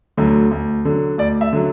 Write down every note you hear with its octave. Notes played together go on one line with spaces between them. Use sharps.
D2 D3 F#3
D2
D3 F#3
D2 D5
E5
D3 F#3